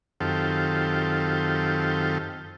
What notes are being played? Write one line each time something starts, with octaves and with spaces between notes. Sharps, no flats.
F#2 D#3 C4 F4 G4 A4